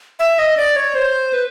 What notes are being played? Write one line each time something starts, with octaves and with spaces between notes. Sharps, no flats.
E5
D#5
D5
C#5
C5
B4